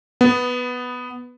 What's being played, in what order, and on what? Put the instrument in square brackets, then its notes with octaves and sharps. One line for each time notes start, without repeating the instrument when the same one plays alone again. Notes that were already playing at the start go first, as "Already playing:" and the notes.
[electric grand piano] B3